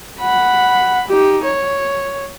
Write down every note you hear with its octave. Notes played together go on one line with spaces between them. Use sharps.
F#5 B5
D#4 G4
C#5